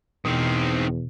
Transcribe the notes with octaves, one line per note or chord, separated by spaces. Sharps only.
E2 B2 D#3 C4